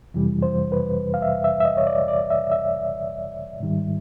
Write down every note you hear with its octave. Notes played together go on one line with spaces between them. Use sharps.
F2 C3 E3 G3
C5
B4
F5
E5
E5
E5
D#5
C#5
D5
D5
E5
E5
G#2 D#3 G3